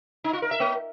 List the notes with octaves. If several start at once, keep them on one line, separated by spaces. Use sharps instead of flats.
D#4
F4
A#4
E5
A#3